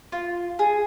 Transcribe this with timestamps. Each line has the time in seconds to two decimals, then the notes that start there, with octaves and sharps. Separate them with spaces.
0.12 F4
0.59 G#4